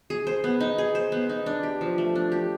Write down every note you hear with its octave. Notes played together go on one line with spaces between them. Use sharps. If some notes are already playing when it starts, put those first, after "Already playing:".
G#4
C5
B3
D#4
G#4
C5
B3
D#4
D4
G4
F3
A3
D4
G4